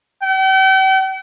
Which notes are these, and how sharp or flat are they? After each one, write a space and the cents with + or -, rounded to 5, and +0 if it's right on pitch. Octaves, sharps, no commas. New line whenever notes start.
G5 -45